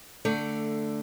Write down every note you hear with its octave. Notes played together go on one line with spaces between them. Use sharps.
D3 A3 D5